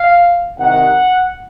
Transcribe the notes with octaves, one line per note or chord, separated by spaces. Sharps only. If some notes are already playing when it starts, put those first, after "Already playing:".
Already playing: F5
C2 C3 D#3 F#5